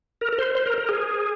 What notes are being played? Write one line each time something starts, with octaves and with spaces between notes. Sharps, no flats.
A#4
A#4
C5
C5
A#4
A#4
G#4